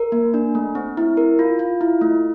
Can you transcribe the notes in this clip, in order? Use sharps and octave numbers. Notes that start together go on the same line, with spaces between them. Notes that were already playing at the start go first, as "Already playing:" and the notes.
Already playing: A#4
A#3
D4
A3
C4
E4
A#4
F4
F4
E4
A3